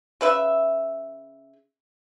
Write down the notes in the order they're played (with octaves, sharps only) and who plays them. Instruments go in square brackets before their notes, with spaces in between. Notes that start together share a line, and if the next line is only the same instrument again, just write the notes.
[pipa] C#3 B4 E5